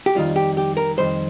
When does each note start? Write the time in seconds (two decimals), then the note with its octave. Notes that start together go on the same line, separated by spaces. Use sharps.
0.06 G4
0.15 F2 D#3 G3 F4
0.36 G4
0.57 G4
0.77 A#4
0.97 F2 D#3 G3 C5